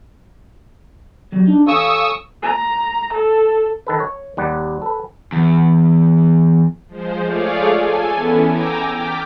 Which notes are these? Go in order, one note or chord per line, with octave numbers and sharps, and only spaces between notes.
F#3 G3
D4 D#4
A4 C#5 F5 G#5 C#6 D#6 E6
A#5
A4
D#3 A4 B4
C#5
D#2 G3 F#5
A4 B4
E2
F3 G#3 C5
A3 F4 G#4 C#5 D5 F5
A4 G#5
E3 B3 C#4 E4
G5 G#5 A#5 D6 E6
G5 D6 F6 A6 B6